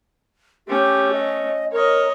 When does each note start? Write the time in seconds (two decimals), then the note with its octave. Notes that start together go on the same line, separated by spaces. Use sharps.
0.68 A3 C#4 G4
1.13 D#5
1.72 A#4 C#5 D#5